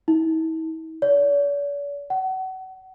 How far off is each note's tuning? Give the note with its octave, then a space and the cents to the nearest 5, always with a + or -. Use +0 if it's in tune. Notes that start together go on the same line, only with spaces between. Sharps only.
E4 -45
D5 -45
F#5 +30